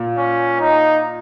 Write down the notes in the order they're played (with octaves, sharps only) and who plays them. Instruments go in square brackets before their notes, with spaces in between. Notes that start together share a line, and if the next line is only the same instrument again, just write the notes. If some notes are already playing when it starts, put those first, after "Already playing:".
Already playing: [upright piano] A#2
[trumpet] C#4
D#4